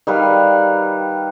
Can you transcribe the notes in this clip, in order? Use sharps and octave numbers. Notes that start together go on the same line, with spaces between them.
D#3 G3 B4 F5